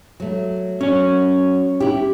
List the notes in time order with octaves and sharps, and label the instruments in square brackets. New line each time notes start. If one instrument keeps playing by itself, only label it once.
[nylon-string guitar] F#3 A3
[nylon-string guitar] F#3 [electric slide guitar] C#4 C#5
[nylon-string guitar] E4 G4